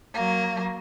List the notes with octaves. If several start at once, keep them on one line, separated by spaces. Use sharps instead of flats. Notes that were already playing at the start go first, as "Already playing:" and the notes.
F#3 A#3